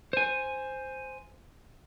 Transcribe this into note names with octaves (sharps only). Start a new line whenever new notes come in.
C5 G#5